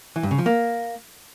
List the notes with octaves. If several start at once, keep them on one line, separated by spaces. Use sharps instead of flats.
E3
G2
C#3
F3
A#3